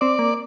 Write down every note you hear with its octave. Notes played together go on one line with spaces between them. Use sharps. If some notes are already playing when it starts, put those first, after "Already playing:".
C4 D5
A#3